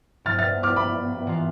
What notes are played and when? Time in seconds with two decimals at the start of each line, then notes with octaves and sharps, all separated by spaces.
0.24 G2 F3 B3 E4 F6 A6
0.39 F6 A6
0.63 D6 F6
0.76 B5 D6
1.27 E3 B3 F4